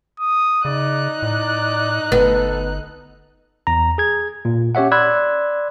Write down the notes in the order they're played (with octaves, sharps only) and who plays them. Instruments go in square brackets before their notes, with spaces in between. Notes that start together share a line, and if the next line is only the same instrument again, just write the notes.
[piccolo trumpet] D#6
[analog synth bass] C#3 [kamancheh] D#4 F#6 [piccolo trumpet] D5
[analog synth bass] A2 [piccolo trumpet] D5
[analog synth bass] G1 [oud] B3 [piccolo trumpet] A4
[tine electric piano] E2 A#5
G#4 G#6
A#2
C#4 G4 C#5 E5 F#5
D5 B5 C6 E6 F#6 G#6